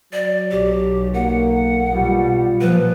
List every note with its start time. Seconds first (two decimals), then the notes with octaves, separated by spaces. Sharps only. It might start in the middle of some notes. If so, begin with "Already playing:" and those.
0.13 F#3 D5
0.51 B1 G4
1.14 A#3 F#5
1.94 B2 G3 F4
2.61 A#2 F3 B4